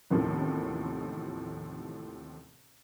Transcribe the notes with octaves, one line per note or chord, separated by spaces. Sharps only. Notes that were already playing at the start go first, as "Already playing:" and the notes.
A1 D#2 A2 C3 D#3 F3